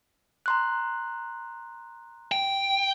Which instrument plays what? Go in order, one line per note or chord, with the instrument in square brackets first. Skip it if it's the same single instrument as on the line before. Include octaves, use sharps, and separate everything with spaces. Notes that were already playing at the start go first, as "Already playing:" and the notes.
[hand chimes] A#5 C6 F#6
[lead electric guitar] G5